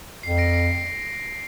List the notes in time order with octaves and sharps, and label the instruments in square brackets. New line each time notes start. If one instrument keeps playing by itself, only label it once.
[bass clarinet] F2 [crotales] C7
[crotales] A#6 D7
C7